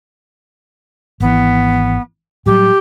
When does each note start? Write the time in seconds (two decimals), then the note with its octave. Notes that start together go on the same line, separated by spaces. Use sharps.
1.20 G#1 E3 B3
2.46 A2 F#3 G3 G4